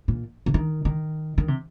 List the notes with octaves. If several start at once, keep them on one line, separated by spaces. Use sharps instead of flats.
A#2
C3
D#3
D#3
D#3
C3